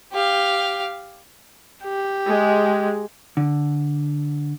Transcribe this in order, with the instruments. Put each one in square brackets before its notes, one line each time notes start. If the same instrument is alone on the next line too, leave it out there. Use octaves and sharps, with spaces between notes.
[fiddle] G4 F5
[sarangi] G4
[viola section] G#3
[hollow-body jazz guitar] D3